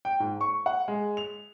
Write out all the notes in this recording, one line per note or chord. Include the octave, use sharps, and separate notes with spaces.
G5
G#2
C#6
F#5
G#3
F7